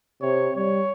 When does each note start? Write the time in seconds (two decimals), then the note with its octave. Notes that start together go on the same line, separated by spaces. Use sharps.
0.22 C3 C#5
0.56 G3 C#5